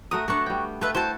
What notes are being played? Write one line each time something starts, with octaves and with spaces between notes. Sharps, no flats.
A3 F#4 A#4 D#6
A3 B3 D4 F#4 C#6
G3 G5
A3 F4 B4 E5
E4 F#4 A4 C5 A5